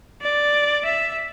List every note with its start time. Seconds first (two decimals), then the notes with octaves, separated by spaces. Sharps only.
0.22 D5
0.85 E5